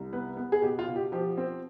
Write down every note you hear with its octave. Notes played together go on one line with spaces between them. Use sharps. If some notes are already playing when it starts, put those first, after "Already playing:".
Already playing: C2
B3 B4
B3
G#4
B2 G4
F4
B2
G4
F3 G4
C4